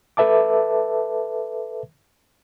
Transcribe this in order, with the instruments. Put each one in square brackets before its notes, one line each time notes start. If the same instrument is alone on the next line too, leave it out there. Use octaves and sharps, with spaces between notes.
[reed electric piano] A4 B4 E5 A5 D6